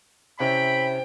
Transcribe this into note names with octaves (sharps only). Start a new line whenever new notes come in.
C3 C#4 E4 C5 G5 B5